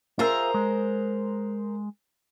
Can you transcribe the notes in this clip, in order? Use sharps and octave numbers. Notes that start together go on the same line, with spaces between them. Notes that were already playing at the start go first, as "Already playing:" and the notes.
F4 G#4 A#4 C5 E5 A#5
G#3